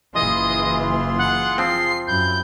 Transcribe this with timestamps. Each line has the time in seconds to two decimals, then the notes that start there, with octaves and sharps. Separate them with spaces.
0.15 F#1 E3 F4 G#4 D#5 C6
1.18 F#5
1.58 F3 C4 C7
2.07 F#2 E4 G6